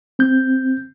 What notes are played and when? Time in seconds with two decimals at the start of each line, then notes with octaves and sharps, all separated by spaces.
0.19 C4 G6